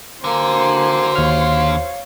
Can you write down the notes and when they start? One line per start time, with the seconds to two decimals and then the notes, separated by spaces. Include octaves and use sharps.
0.24 D3 A#3 F#4 C5 G#5
1.16 D#2 C#5 F5 F6